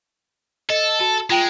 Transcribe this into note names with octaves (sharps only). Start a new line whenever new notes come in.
A4 D#5
F#4 A5
G#3 F4 G5 D7